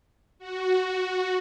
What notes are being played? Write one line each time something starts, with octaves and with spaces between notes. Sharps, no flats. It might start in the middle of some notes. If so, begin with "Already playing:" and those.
F#4